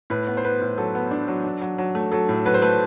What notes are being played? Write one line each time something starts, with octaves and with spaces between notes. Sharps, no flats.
A2 B4
B3
C5
B3 B4
A2
F#3 A4
B3
D4
F#3
D4
F#3
F#3
A3
F#3 A4
A2
F#3 B4
C5
A3 B4